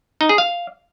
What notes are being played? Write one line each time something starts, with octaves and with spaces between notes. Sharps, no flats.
D#4
G#4
F5